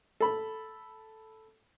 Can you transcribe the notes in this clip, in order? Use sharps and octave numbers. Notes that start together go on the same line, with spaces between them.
A4 B5